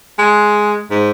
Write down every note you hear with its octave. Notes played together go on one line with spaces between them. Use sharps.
G#3
G#2